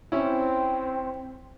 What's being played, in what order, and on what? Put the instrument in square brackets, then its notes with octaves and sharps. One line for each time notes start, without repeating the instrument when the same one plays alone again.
[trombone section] C4 [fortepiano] C#4 E4